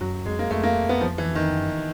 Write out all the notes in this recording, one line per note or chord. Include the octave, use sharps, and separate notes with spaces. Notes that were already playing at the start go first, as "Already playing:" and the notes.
F#2 F#3
F2 G#3
A#3
F2 A3
A#3
B3
F3
E3
D#3
F#2